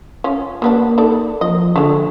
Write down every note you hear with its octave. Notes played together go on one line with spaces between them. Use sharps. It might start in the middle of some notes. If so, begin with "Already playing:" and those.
F3 C#4 F4
G3 A#3 B3 D4
D#4 A4 D5
F3 D#5
D3 G#3 A3